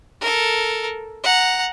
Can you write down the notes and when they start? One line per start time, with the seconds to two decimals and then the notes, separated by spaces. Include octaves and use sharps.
0.21 A4 A#4
1.23 F#5 A#5